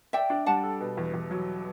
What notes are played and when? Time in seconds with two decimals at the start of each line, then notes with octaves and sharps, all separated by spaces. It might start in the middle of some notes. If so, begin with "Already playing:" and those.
0.13 D5 E5 G5
0.30 D4
0.46 G3 F#5 A5
0.63 A4
0.81 B2
0.97 E2
1.14 E2
1.31 F#3